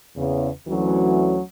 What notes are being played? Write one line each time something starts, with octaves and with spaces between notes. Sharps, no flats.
E2 C#3
D2 E3 F#3 A3 C#4 F#4